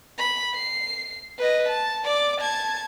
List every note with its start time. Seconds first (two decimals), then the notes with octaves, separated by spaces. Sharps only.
0.18 B5
0.55 C7
1.38 B4 D#5
1.69 A5
2.05 D5 D6
2.41 A5 G#6